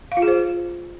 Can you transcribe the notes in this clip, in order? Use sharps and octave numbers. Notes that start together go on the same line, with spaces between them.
F5
F4
G#4
C5